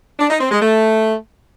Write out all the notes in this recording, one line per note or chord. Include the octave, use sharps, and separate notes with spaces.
D4
D#4
C4
G#3
A3